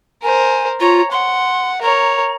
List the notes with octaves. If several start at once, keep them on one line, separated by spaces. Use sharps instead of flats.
A#4 C5 G#5
F4 C#5 A#5
F#5 C6
A#4 C#5 A#5